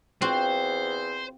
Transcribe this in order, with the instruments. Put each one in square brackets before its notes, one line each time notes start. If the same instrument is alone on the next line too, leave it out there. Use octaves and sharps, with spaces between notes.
[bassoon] E2 [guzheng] C4 F4 F#4 [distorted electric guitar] C5